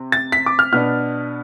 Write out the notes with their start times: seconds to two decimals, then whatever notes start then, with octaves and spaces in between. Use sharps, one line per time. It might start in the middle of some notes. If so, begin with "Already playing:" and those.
Already playing: C3
0.12 A6
0.32 B6
0.46 D6
0.59 F6
0.73 B2 B3 D4 F6